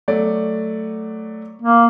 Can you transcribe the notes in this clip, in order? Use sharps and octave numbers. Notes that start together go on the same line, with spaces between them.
F#3 A3 D5
A#3